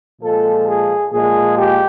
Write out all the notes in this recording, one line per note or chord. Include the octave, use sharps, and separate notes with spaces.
A#2 F3 G#3 A4
G#4
A#2 F3 G#3 G#4
G4